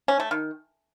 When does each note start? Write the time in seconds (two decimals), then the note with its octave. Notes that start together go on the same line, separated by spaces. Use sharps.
0.08 C#4
0.20 A3
0.31 D#3